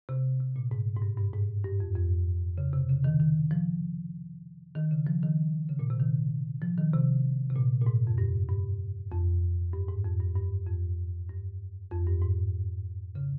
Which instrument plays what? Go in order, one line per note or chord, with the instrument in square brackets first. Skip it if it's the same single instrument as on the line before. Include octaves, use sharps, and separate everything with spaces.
[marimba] C3
C3
A#2
G#2
G#2
G2
G2
G#2
G2
F2
F2
C#3
C3
C#3
D#3
D#3
F3
D#3
C#3
F3
D#3
C#3
A#2
C3
D#3
F3
D#3
C3
C3
A#2
A#2
G#2
F2
G2
G2
F2
G2
G#2
F2
G2
G2
F2
G2
F2
G2
G#2
C#3